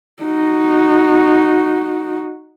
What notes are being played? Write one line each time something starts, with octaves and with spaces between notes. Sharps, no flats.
D#4 F#4